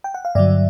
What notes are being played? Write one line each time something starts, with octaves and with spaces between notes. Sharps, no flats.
G5
F#5
F5
G2 D3 F#3 D5 E5